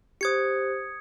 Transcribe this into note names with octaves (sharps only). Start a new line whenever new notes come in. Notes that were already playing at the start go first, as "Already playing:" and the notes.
G4 C5 D#6 G#6 C#7